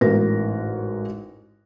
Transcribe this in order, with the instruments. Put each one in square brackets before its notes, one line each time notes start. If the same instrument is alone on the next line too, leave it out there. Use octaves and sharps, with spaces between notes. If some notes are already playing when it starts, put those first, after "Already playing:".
[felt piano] A1 G#2 F#4 A#4 A#6